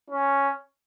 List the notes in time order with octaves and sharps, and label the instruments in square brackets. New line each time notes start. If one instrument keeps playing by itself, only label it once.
[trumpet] C#4